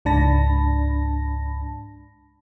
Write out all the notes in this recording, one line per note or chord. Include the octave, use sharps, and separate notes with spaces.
C#2 G#2 D4 A5 B5 A#6